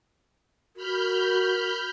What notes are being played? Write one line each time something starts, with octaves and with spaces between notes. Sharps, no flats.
F#4 A#4 B5 F6 G6